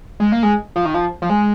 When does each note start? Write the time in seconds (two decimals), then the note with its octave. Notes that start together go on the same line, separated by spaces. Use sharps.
0.20 G#3
0.32 A#3
0.43 G#3
0.76 F3
0.85 D#3
0.94 F3
1.22 F3
1.30 G#3